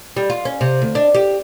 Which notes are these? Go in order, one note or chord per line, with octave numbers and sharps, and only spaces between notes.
G3
F4
C#4
C3
D2
D4
G4